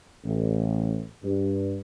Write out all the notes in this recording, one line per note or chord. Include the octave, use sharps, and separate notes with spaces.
A1
G2